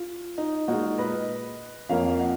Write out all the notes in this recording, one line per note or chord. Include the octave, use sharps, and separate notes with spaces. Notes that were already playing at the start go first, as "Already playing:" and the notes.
Already playing: F4
D#4
A#2 G#3 D#4 F#4
B4 D#5
F2 F3 A#3 C#5 F5
D#5 F#5